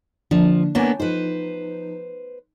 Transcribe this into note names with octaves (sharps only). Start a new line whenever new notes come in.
D3 F3 A#3 D4
A#3 B3 D4 C#5 G#5
F3 D#4 B4 C5